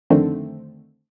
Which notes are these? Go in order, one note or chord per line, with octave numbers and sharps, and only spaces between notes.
F2 D3 D#3 A3 C4